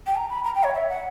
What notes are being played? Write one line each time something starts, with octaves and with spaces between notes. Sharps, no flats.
G5
A#5
B5
A#5
G5
C#5
E5
F#5